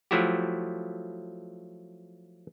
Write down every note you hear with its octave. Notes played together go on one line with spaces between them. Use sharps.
F3 F#3 A3 E4 F#4 G4